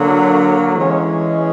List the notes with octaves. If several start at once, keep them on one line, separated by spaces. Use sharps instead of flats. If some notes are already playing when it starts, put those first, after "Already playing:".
Already playing: D3 F#3 A#3
E3 G#3 C#4